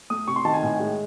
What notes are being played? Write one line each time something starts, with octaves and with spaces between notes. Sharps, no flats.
A3 D#6
C3 C#6
C6
D#3 A5
G#5
A2
G#3